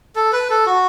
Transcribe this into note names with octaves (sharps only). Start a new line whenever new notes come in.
A4
B4
A4
F#4